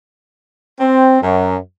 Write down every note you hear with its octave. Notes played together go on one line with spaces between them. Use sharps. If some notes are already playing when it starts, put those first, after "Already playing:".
C4
F#2